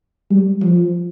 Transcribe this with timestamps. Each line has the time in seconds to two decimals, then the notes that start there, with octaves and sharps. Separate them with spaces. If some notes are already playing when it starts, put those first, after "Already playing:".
0.31 G3
0.62 F3